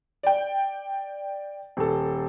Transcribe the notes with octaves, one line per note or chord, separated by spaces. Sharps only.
D5 G5
D#1 A4